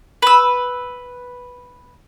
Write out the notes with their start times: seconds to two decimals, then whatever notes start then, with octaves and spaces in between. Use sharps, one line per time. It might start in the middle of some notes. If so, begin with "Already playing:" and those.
0.22 B4 E6